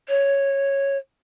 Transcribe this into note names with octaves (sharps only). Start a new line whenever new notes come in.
C#5